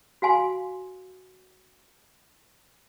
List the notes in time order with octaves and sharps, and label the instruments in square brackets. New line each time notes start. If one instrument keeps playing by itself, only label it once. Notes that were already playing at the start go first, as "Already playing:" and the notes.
[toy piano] F#4 F5 G#5 C6